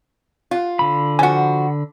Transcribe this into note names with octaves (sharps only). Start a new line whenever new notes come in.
F4
D3 B5
F3 F#4 F#5 G#5